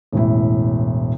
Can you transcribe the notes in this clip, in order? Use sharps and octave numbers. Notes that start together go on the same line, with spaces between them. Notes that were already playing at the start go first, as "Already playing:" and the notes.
E1 A1 E4